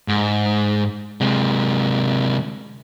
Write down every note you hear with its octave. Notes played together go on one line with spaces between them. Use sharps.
G#2
C3 G#3